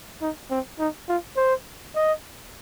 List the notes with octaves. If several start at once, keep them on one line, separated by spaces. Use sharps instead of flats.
D#4
C4
D#4
F4
C5
D#5